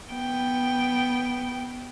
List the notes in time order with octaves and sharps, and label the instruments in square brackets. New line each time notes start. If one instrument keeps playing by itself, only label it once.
[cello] B3 G5